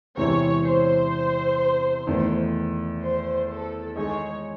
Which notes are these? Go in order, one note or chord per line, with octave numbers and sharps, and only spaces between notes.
E2 C3 E3 G#3 C4 C#5
C5
E2 D#3 A3
C5
A4
D#3 G#3 D#4 G#4 C#5 D#5